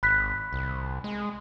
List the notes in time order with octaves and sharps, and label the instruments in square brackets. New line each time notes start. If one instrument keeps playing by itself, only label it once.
[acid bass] G#1 [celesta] B5 F#6 B6
[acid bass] C2
G#3